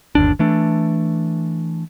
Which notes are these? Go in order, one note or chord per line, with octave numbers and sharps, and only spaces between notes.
G1 D#2 D4
E3 A3 D4